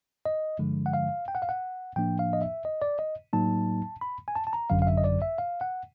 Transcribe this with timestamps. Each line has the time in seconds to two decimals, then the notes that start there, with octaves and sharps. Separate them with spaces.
0.26 D#5
0.59 G2 D3 F3 G#3
0.86 F#5
0.94 F5
1.28 G5
1.35 F#5
1.42 F5
1.49 F#5
1.96 A2 F3 A#3 D4 G5
2.19 F5
2.33 D#5
2.42 E5
2.65 D#5
2.82 D5
2.99 D#5
3.33 A2 F#3 A#3 D#4 A5
4.01 B5
4.28 G#5
4.36 A5
4.47 A5
4.53 A#5
4.70 G#1 F#2 D3 F#3 F5
4.82 F5
4.87 E5
4.97 D#5
5.04 D5
5.22 E5
5.38 F5
5.61 F#5